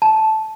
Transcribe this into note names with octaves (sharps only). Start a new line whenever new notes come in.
A5